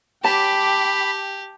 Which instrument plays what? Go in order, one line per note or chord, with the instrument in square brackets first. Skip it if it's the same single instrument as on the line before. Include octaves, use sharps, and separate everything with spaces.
[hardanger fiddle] G4 [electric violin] G5 D6 [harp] A5 [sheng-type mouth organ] B5